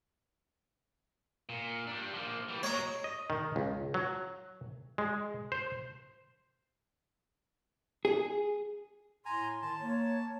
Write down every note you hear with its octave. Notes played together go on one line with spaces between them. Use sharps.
A#2
G3 D4
F3 A#3
E3 G3
F#3 G#3 C#5 A#5
D#5
D#3
C#2
F#3
G#3
C5
G#4
A2 G#5 A#5 C6
D#3 A5 C6
A#3 C#5